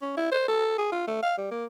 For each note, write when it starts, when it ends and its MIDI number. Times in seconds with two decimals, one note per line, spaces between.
0.02 0.15 61
0.17 0.30 64
0.32 0.44 72
0.48 0.78 69
0.78 0.87 68
0.92 1.04 65
1.07 1.18 57
1.23 1.36 77
1.38 1.48 55
1.51 1.65 58